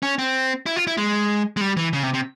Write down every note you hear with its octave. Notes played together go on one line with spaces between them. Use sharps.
C#4
C4
E4
F4
E4
G#3
G#3
G3
E3
C#3
C3
C3